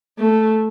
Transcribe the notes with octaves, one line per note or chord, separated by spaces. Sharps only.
A3